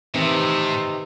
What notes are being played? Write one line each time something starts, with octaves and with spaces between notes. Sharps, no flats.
A2 C3 D#3 E3 C4 B4